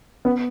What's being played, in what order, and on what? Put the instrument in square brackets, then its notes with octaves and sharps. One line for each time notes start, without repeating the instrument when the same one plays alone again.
[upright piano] B3